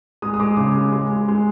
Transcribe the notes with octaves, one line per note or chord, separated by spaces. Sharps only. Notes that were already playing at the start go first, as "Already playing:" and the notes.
G#3 D#6
D#6
G#3 D6
C#3 D6
G#3
G#3
G#3
G#3